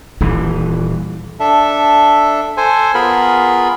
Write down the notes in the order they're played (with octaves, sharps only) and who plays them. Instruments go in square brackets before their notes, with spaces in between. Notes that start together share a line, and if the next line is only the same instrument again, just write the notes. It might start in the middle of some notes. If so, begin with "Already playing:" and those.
[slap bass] D#1 E3 [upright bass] F4
[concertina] D4 A4 E5
A4 C5 G#5
B3 F4 G#4 A#4 B5